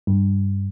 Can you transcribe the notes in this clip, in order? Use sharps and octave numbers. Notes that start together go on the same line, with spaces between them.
G2